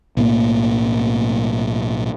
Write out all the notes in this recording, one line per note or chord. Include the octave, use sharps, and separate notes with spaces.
B1 A2 A#3